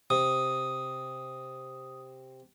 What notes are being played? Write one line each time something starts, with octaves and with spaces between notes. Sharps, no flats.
C3 D#6